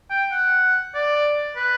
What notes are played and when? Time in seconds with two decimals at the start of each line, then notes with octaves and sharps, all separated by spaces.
0.10 G5
0.32 F#5
0.95 D5
1.57 B4